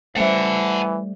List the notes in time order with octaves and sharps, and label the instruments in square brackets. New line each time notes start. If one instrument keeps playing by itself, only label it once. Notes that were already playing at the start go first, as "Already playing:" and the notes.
[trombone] E3 [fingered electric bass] G3 A3 [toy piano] C#4 C5 E5 [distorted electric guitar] F#5 A5